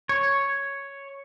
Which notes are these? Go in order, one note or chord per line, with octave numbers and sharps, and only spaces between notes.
C#5